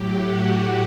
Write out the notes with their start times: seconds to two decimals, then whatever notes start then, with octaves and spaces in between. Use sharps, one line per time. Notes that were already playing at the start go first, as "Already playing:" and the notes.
Already playing: A2 F#3 G4
0.13 F#4